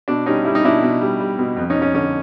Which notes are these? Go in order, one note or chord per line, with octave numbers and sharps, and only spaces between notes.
B2 D4
G3 C#4 D#4
G3 E4
D#4
B2 D4 E4
B2
G3
G3
B2
F2
C#4 D#4
F2
C#4
D3 C#4